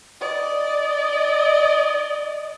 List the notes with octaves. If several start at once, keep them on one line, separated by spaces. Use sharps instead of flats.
D5 D#5